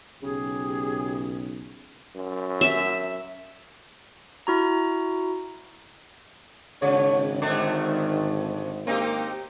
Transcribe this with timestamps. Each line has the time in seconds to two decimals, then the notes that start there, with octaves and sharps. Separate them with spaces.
0.23 B1 C#3 G4 G#4
2.16 F#2
2.61 E5
4.47 E4 F#4 A#5
6.82 G#1 C#3 G#4 C#5
7.42 G#2 D3 D#3 A3 C5
8.87 A#3 C4 D#4 G4